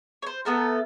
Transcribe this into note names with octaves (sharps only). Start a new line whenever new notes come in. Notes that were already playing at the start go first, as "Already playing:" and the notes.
C5 C#5
A3 B3 A4 A#4